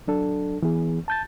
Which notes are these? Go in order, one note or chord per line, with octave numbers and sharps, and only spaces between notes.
F#3 D4 A4
E3 B3 G#4
A5 G6 A6